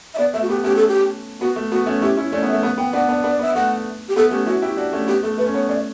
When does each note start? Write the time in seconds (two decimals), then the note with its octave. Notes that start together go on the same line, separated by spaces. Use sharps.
0.14 E5
0.18 B3 D5
0.33 A3 E5
0.42 F#4
0.49 B3 G4
0.64 A3 C#4 G4
0.76 A4
0.88 G4
1.41 B3 F#4
1.56 A3
1.71 B3 F#4
1.86 A3 C#4
2.02 C#4 E4 G4
2.17 C#4 E4
2.32 A3 C#4 D5
2.43 B3
2.48 E5
2.52 A3
2.63 B3 F#5
2.78 B3 G5
2.93 B3 D4 F#5
3.09 B3 D4
3.24 B3 D4
3.29 D5
3.39 B3
3.42 E5
3.55 A3 F#5
4.09 G4
4.16 B3 A4
4.31 A3 C#4 G4
4.46 C#4 E4 F#4
4.62 E4 G4
4.77 D4 F#4
4.93 A3 C#4
5.08 B3 G4
5.23 A3 A4
5.38 A3 B4
5.46 C#4
5.54 B3 C#5
5.69 A3 C#4 D5